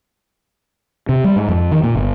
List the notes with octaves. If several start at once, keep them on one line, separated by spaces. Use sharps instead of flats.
C3
G3
G#2
F2
D#3
A#2
G1